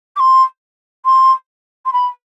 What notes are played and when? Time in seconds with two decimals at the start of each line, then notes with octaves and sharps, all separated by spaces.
0.16 D6
0.20 C6
1.05 C6
1.85 C6
1.93 B5